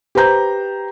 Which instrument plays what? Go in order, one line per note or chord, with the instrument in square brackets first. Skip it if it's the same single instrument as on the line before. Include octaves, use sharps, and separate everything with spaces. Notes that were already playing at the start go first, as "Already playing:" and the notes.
[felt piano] G4 B4 C5 A#5 G6